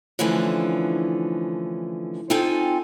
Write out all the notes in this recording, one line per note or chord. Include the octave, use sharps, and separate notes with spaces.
D3 E3 F3 A3 C#4
C4 D#4 F4 A4 G5 G#5